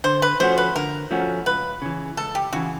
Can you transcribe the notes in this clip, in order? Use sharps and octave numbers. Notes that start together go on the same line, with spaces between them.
D3 C5
B4
F3 A3 C#4 F#4 C5
B4
D3 A#4
F3 A3 C#4 F#4
C#2 B4
C#3 E3
C#2 A4
G4
C#3 E3 F#4